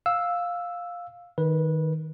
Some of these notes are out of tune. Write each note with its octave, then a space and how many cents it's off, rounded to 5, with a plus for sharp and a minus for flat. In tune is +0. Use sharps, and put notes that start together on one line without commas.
F5 +10 E6 +0
D#3 +0 B4 -20